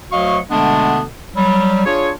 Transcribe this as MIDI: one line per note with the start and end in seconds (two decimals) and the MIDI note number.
0.12 0.39 38
0.12 0.39 54
0.12 0.39 66
0.12 0.39 75
0.12 0.39 77
0.12 0.39 85
0.51 1.02 47
0.51 1.02 50
0.51 1.02 56
0.51 1.02 57
0.51 1.02 59
0.51 1.02 62
1.36 1.82 54
1.36 1.82 55
1.86 2.10 62
1.86 2.10 65
1.86 2.10 68
1.86 2.10 73